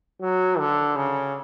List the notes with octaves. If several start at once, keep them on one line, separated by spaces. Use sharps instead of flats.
F#3
D3
C#3